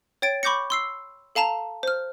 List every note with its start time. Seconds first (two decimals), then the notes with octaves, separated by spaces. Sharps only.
0.22 C#5 G5 A6 D7
0.43 B5 C#6 D6 G6 A#6 C#7
0.70 C6 E6 C7
1.35 A4 F5 A5 A#5 E7
1.83 C5 F6